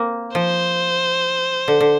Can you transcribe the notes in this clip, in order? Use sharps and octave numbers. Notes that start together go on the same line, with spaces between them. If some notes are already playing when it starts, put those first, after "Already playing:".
Already playing: A#3 C4
F3 C5
D3
D3